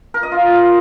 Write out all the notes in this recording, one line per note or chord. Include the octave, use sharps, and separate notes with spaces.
A#4
D#5
F4